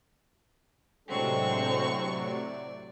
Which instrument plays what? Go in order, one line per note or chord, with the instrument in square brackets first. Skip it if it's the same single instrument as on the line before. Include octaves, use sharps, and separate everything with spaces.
[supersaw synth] A2 C3 F#3 [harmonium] G#3 D4 A4 [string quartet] C4 C#6
[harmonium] D5